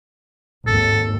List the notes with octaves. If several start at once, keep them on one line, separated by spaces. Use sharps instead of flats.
G#1 D#2 A4